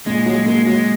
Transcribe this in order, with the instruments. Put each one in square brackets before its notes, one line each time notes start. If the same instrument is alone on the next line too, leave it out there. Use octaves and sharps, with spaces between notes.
[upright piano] A#2 [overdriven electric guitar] G#3
[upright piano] F#3 [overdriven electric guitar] G#3
[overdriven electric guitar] G#3 [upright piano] A#3
[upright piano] F#3 [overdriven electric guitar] G#3